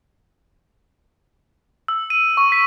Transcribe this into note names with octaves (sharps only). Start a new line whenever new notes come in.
E6
D#7
C#6
B6